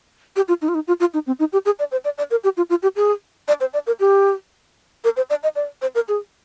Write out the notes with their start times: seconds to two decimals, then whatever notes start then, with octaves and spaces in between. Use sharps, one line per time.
0.36 G4
0.48 F4
0.62 D#4
0.69 F4
0.75 D#4
0.88 F4
1.00 F4
1.14 D#4
1.27 C4
1.40 D#4
1.53 G4
1.66 G#4
1.79 D5
1.92 C5
2.05 D5
2.18 D5
2.31 A#4
2.44 G4
2.57 F4
2.70 F4
2.83 G4
2.96 G#4
3.48 D5
3.61 C5
3.74 D5
3.87 A#4
4.00 G4
5.04 A#4
5.17 C5
5.30 D5
5.43 D#5
5.56 D5
5.82 C5
5.95 A#4
6.08 G#4